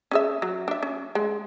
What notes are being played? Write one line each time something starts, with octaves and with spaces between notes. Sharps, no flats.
C#4 G#4 E5
F#3
D4 E5
C#4
G#3